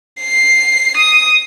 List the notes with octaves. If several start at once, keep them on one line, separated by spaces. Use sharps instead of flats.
C7
D#6